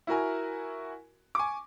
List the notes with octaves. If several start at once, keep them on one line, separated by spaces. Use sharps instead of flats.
E4 F#4 A#4 G#5
G#5 C#6 D6